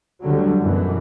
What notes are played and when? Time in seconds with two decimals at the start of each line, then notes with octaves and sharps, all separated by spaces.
0.22 D2 D3 F#3 G3
0.59 F#2 B2 E3